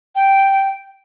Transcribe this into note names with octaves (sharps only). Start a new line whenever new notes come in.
G5